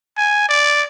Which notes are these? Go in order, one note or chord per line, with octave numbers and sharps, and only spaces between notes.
G#5
D5